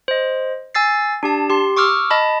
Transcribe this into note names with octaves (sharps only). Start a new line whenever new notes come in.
C5 D#5
G#5 E6 A6 C7
D4 G4 A5
G4 C6
C#6 D6 E6 F6
D#5 A5 B5